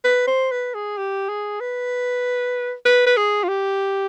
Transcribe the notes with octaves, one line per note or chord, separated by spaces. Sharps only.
B4
C5
B4
G#4
G4
G#4
B4
B4
B4
G#4
F4
G4